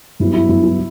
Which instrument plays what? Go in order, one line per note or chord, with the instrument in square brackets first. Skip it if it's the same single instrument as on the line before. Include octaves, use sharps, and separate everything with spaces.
[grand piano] G2 F#3 B3 E4
E4
G2 F#3 B3 E4
E4